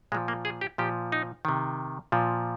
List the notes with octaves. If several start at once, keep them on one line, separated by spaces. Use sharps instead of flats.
A#2 F3 G#3
A#3
G#4
G4
A#2 F3 G4
D#4
C3 D#3
A#2 F3